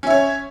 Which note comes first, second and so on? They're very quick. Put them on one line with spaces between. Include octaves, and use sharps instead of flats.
C#4 E5 C#5